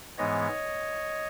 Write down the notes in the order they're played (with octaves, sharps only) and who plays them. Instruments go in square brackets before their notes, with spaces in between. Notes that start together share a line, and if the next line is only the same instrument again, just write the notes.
[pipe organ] G#2 E3 G#3 B3 C#5 D#5